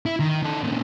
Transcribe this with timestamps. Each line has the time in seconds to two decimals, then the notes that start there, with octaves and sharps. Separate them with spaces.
0.06 E4
0.20 D#3
0.43 D#3 A4
0.64 A#2 C#3